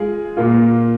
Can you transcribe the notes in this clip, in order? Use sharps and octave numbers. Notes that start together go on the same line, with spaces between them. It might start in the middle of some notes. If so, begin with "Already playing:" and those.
Already playing: G#3 F4 G#4
A#2 A#3 F4